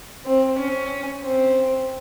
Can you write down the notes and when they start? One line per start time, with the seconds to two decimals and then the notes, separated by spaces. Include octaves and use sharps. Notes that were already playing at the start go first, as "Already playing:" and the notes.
0.26 C4
0.59 C#4
1.24 C4